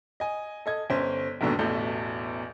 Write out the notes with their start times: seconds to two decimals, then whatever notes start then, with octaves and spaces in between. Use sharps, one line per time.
0.20 D#5 G#5
0.66 A4 D#5 G#6
0.90 G1 C#4 C5
1.41 G1 D#2 G#2 B2 D3
1.59 A1 E2 B2 A3 G6